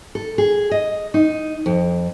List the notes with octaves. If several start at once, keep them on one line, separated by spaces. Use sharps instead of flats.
A4
G#4
D#5
D#4
F2